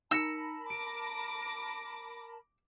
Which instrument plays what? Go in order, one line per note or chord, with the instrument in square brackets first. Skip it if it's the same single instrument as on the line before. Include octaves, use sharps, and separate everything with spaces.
[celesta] D#4 A#6 C#7 [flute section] A#4 A5 B5 [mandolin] E6
[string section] D6 A#6 [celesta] D7